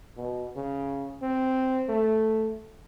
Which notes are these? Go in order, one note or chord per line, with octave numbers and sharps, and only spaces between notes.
B2
C#3
C4
A3